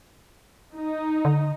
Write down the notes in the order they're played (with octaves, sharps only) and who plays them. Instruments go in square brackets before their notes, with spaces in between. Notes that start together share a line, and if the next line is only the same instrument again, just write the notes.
[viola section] D#4
[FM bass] D3